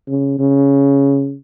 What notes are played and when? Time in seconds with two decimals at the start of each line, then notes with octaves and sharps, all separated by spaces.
0.08 C#3
0.39 C#3